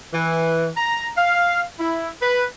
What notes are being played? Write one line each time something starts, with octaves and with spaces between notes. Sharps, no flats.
E3
A#5
F5
E4
B4